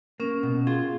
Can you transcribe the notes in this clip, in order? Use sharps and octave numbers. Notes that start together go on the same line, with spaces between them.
A#3 C#4
B2
F4 G#4